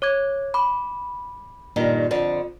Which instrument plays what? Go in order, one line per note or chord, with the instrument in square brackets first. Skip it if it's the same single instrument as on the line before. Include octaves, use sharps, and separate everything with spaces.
[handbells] C#5 D6 G#6
B5 D6
[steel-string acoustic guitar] G2 A#2 D#3
F2 D3 A5